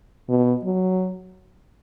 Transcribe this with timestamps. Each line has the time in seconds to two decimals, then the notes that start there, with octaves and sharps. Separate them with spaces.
0.29 B2
0.64 F#3